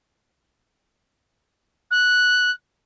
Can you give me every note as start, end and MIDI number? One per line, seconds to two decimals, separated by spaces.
1.91 2.51 90